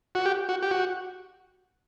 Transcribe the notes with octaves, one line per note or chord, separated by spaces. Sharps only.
F#4
G4
F#4
G4
F#4